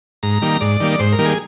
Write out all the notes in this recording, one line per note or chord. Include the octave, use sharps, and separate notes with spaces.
G#2 A#5
D#3 G3 A#3
G#2 D5
D#3 G3 A#3
G#2 C5
A#4
D#3 G3 A#3
G#4